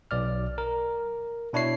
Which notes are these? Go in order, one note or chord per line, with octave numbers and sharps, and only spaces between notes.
B1 D5 F6
A#4
B2 D4 E4 C#5 C7